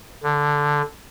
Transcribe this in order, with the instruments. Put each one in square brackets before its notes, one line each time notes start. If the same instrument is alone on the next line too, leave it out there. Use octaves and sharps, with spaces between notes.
[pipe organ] D3